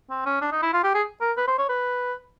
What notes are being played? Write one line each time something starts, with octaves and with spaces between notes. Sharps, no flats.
C4
C#4
D4
D#4
E4
F4
G4
G#4
A#4
B4
C5
C#5
B4